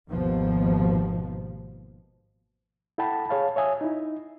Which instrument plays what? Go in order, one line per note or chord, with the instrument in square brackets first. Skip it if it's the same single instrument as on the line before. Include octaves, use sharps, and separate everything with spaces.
[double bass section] G#1 D#2 B2 F3
[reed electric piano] E4 A4 F#5 G5 A5 B5
G#4 C#5 F5 A5
C#5 E5 G#5 D#6
D#4 E4